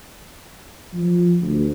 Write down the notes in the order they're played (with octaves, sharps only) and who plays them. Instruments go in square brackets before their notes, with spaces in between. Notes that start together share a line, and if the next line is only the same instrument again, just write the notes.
[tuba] F3
D2